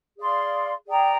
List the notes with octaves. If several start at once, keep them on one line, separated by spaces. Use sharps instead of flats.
G#4 D5 F5 C6
G#4 D5 G5 A#5